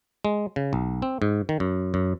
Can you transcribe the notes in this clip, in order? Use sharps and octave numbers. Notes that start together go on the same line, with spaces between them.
G#3
C#3
B1
C4
G#2
D#3
F#2
F#2